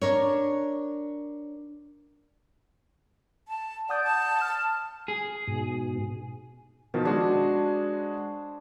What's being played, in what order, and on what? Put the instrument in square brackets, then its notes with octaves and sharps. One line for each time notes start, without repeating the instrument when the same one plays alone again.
[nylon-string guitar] D4 A#4 C#5
[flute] A5
[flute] D5 [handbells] F#5 D#6 G6
[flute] A5
[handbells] F6
[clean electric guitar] G#4
[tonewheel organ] G#2 B2
[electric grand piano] B2 D#3 F3 [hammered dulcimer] A5
[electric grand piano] G#3 F#4 G#4 [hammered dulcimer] D4 C5